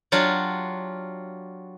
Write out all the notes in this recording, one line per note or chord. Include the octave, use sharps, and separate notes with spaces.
F#3 D4 F4 G4